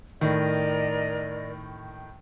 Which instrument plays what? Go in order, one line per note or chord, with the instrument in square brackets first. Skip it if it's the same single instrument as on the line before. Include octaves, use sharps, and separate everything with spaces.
[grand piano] A2 D#3 [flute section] A#4 D5 D#5